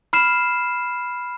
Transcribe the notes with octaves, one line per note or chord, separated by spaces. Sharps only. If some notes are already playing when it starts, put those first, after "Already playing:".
B5 F6 C7 E7